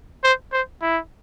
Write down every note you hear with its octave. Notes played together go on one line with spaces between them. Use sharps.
C5
C5
E4